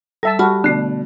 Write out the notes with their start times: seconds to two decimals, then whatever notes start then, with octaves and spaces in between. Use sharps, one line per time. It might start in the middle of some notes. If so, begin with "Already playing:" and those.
0.23 G3 A4 E5 A5
0.39 G3 F#4 A5 B5 F6
0.64 B2 D3 A3 D4